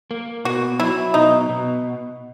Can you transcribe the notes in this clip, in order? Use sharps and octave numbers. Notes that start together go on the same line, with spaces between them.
A#3
B2 F#4
F#3 E4
B2 D#4
B2